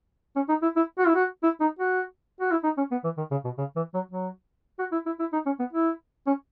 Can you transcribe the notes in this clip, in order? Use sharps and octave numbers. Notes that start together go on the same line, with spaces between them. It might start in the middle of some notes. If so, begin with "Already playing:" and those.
C#4
D#4
E4
E4
F#4
E4
F#4
E4
D#4
F#4
F#4
E4
D#4
C#4
B3
E3
D#3
C#3
B2
C#3
E3
F#3
F#3
F#4
E4
E4
E4
D#4
C#4
B3
E4
C#4